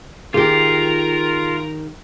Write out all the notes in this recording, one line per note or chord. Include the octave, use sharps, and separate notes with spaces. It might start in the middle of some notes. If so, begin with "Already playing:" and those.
D#3 F4 G4 G#4 A#4